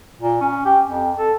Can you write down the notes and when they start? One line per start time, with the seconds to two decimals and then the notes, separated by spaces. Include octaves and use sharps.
0.21 A#2
0.41 C#4
0.65 G4
0.88 F2
1.18 A4